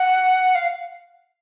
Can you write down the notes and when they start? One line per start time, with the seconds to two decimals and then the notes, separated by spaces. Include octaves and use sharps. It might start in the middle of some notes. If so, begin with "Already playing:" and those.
Already playing: F#5
0.55 F5